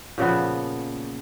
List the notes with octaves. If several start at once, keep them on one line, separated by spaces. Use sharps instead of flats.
A#2 C#3 F3 B3